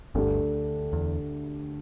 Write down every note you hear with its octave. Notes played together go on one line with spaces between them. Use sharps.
G1 D2 G2 D3 A3 D4 G4
E2